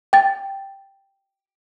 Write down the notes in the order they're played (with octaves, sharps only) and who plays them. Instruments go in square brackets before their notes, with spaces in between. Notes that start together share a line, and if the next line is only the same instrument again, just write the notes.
[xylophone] G5 A6